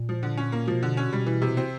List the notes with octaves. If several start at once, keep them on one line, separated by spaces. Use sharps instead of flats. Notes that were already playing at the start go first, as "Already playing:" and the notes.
Already playing: A#2
F3
D3
C#4
A#3
B2 F3
D3
C#4
B2 G3
E3
C3
C4